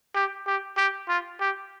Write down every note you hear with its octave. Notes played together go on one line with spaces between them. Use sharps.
G4
G4
G4
F4
G4